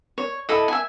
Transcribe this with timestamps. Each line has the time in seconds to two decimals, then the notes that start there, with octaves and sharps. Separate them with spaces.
0.18 C#5
0.49 E4 A4 D#5
0.68 E5 G#5